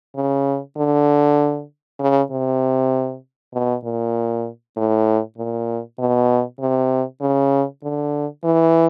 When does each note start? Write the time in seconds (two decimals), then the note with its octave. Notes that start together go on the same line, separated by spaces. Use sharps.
0.16 C#3
0.77 D3
2.00 C#3
2.31 C3
3.54 B2
3.84 A#2
4.77 A2
5.38 A#2
5.99 B2
6.60 C3
7.21 C#3
7.83 D3
8.44 E3